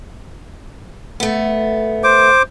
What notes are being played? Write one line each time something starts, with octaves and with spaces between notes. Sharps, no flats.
A3 B3
C5 D6